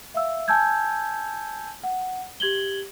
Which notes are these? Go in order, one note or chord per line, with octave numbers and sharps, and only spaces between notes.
E5 F5 E6
G#5 A5 E6 G6 G#6
F#5
G4 G#6 F#7 G7